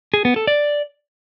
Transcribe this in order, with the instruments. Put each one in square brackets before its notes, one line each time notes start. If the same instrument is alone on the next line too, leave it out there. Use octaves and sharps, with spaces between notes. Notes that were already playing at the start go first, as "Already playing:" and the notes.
[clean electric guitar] G#4
B3
A4
D5